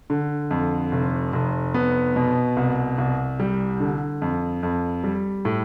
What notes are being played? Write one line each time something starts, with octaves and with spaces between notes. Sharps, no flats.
D3
F2
F1
F1
B3
B2
C2
C2
G3
D3
F2
F2
G3
A2